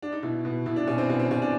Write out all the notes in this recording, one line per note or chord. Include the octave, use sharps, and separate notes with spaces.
D4
D#4
B2 E4
B2
B2 E4
D4
B2 C#4
C4
B2 C#4
C4
B2 C#4
D4